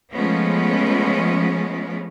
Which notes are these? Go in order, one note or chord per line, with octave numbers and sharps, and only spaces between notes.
F3 G#3 A3 B3 C#4